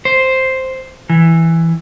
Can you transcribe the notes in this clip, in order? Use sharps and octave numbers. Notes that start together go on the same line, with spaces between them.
C5
E3